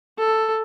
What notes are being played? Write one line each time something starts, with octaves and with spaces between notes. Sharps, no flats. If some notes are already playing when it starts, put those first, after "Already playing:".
A4